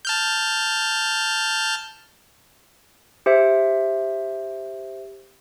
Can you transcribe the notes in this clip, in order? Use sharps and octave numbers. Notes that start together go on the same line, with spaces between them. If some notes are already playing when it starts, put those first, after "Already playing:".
A5 F6 G6
G4 C5 E5